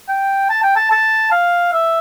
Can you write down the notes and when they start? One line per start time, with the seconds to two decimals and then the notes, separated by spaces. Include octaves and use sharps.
0.09 G5
0.50 A5
0.63 G5
0.76 A5
0.91 A5
1.32 F5
1.73 E5